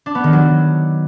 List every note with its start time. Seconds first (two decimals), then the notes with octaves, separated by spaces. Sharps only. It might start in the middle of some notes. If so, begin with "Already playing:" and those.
0.06 D4
0.15 B3
0.24 D#3
0.33 F#3